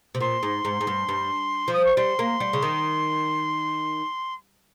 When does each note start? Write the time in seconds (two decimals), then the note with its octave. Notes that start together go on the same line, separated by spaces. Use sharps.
0.15 C3
0.21 A#2 C6
0.43 G#2
0.65 G#2
0.81 G#2
0.87 G2
1.09 G2
1.68 F3
1.73 D#6
1.85 C#6
1.96 G3 C6
2.19 A#3
2.40 G3
2.53 C#3
2.62 D#3